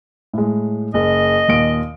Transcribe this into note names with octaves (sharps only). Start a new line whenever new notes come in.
A2 G#3
F#1 D#5
D#2 A#2 D7